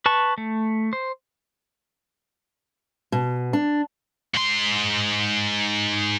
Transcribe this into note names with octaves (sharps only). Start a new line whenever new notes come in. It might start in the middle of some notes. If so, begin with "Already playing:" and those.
B4 A5 C#6
A3
C5
B2
D4
G#2 C6